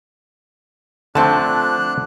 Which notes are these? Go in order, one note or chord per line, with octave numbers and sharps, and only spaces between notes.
D3 F3 A3 C4 D4 A5 F#6